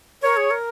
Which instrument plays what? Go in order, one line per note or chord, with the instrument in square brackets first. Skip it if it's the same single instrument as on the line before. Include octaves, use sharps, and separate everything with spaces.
[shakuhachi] A#4 [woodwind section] C#5
[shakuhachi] G#4
A#4